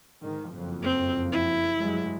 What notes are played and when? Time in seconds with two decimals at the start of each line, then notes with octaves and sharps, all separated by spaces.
0.21 G#2 D#3
0.52 F#1 F2 F3
0.82 C4
1.32 E4
1.80 G2 F#3 G#3